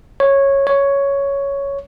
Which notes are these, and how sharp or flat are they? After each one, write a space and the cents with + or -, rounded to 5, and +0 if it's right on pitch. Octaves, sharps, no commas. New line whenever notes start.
C#5 -10
C#5 +5